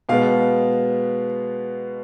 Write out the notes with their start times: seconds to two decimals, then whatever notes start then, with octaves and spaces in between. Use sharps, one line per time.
0.09 B2 G#3 B3 F5